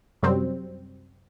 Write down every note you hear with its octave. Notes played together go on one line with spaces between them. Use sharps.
F#2 C3 F#3 G3 C4